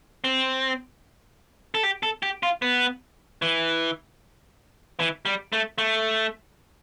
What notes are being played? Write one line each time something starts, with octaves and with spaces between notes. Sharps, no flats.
C4
A4
G4
A4
G4
F4
B3
E3
E3
G3
A3
A3